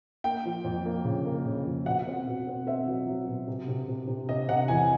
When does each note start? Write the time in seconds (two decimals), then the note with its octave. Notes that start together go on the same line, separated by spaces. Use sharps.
0.24 A#3 G5
0.45 F3
0.64 F2
0.85 A#3
1.05 C#3
1.25 A#3
1.45 C#3
1.66 F2
1.86 B2 F#5
2.07 C4
2.27 B2
2.47 C4
2.67 C4 E5
2.87 F#3
3.07 F#3
3.28 B2
3.48 C3
3.68 C3
3.88 C3
4.08 C3
4.29 C3 D#5
4.48 C3 F#5
4.68 E2 G#5